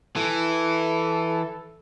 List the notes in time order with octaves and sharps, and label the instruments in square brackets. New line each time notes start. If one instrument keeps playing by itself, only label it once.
[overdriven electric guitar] E3 [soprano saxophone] A4